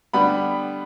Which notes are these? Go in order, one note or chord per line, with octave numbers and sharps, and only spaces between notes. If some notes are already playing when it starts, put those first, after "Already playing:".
D3 G3 B3 B5